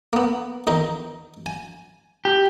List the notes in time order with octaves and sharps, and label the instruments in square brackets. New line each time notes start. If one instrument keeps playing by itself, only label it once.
[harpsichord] A#3 B3
E2 D#3 D#4
G#5
[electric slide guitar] G4